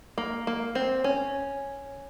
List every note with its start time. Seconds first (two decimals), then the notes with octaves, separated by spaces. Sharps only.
0.18 A#3
0.47 A#3
0.75 C4
1.04 C#4